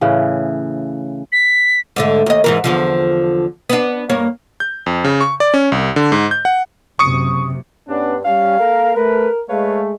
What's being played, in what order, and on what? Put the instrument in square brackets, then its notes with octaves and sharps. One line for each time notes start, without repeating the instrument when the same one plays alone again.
[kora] A2 C#3 E3
[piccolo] B6
[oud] G#2 D3 A3
D#2 D#5
G#2 E3 A#4
E2 D3 F3
B3 D4
G2 A#3 C#5
[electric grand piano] G6
F2
C#3
C#6
D5
C#4
C2
D3
G#2
G6
F#5
[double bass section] F#1 C3 [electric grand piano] C#6 D#6 C#7
[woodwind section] G2 [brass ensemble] B3 C#4 D4
[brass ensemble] G3 C#4 [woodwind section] F5
[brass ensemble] A#3 A4 A#4
[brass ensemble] A3 B4 [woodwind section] A#4
[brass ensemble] G#3 A3 [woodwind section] B4 C#5 F5